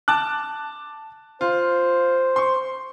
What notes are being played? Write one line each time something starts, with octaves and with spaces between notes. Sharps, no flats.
A5 D6 F#6
F4 C5
C6 C#6